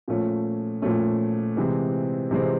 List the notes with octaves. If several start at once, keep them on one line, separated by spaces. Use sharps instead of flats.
A#2 F3 A3 C#4
A#2 F3 A3 C#4
C3 E3 G#3 C4
C3 E3 G#3 C4